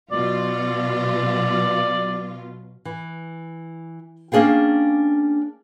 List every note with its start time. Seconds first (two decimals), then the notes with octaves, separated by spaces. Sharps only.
0.12 B2 F#3 F4 D5
2.85 E3
4.32 A#3 C#4 D4 G#4 F5 G5